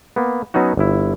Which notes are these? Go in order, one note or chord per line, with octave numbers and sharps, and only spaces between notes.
A#3 B3
F#3 B3 C#4 D#4 F#4
G1 E4